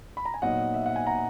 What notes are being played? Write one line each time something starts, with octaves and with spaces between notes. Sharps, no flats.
B5
A#5
G#5
A#2 F#3 B3 D#4 D#5 F#5
E5
F#5
G#5
F#5 A#5